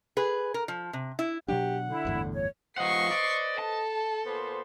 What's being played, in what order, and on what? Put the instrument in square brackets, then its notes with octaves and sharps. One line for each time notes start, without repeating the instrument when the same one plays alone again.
[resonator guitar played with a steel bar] G#4 B4
A#4
F3
C3
E4
[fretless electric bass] B2 F#3 D4 [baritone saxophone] G4 [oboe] F#5
[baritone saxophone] D3 [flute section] E4
[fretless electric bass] G1 E2 A2
[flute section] C#5
[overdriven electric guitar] F3 F#5 [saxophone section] B4 C5 D#5 [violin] C#6 C7
[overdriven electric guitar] D5
[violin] A4 [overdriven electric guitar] A5
[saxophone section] A#2 B3 C5